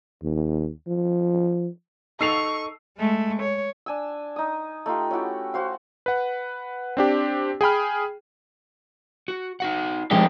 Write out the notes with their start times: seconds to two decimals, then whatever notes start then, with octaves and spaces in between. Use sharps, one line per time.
0.23 D#2
0.87 F3
2.21 D#4 A4 C#6 E6 C7 F7
2.98 G#3 A3
3.42 C#5
3.86 D4 G#5 E6
4.36 D#4 D#6
4.86 A3 D#4 F4 G4
5.11 C#4 E4 F#4 G4
5.54 F#4 C5 F5
6.06 B4 F#5
6.97 C4 D4 G4
7.61 G#4 G5 B5 F6
9.28 F#4
9.60 D#4 F#4 F#5
10.11 F2 F3 G#3 G4